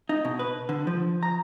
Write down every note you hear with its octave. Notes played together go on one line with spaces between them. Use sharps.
D#4
B2
B4
D3
F3
A#5